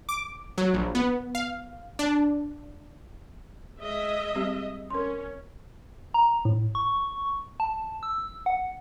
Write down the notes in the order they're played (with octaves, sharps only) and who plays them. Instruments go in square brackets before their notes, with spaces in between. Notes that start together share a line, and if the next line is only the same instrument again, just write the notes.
[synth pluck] D6
F#3
A#1
B3
F5
D4
[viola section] G#3 D#5 E5
[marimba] G3 C4 G4
[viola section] C#4 [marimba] A#4 C6
[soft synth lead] A#5
A2
C#6
A5
E6
F#5